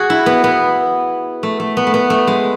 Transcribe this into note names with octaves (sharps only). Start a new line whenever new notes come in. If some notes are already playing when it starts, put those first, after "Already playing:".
Already playing: F#4 G#4
E4
B3
B3
A3
A3
B3
A3
B3
A3
G#3